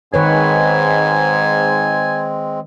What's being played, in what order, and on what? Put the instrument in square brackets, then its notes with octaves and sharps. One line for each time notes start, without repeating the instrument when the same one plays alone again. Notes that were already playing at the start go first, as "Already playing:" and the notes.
[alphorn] G#2 [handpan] D#3 B4 C#5 [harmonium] G#3 C4 [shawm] G#5